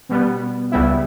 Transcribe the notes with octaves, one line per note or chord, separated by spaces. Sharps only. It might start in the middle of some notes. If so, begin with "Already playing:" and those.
B2 G3 B3
C#2 C#3 G3 B3 E4